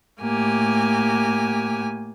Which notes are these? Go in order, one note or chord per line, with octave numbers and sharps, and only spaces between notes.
A2 A#3 G4 G#5